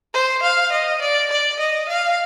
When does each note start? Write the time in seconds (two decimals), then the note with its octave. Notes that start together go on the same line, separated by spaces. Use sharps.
0.14 C5
0.42 F5
0.72 D#5
1.01 D5
1.30 D5
1.59 D#5
1.88 F5